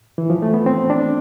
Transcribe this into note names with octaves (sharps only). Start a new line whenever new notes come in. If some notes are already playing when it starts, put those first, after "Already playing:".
E3
F3
A3
B3
C4
D4